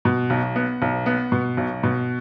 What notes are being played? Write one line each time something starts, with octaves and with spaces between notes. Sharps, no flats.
B2
B1
B3
B1
B3
B2
B1
B2